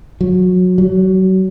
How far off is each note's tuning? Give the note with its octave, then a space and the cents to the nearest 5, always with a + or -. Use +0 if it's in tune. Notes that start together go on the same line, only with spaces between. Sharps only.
F#3 -20
F#3 +30